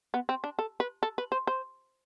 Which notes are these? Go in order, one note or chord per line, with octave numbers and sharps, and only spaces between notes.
B3
C4
D4
A4
B4
A4
B4
C5
C5